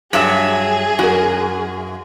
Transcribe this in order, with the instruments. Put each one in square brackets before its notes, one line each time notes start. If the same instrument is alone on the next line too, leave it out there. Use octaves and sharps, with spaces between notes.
[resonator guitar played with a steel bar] G2 F#3 E5 [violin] G#4
[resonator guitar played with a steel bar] F#2 [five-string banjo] F#4 A#4